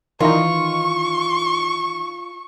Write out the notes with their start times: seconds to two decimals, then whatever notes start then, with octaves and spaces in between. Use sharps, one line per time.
0.20 D#3 E3 D#4 F4 C#6